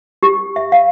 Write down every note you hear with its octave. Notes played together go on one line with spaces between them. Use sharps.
G4
E5
F5